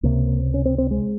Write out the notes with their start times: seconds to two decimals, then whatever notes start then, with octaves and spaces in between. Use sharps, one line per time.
0.03 C#2 C3 A#3
0.54 C#4
0.65 C4
0.78 C4
0.91 G#3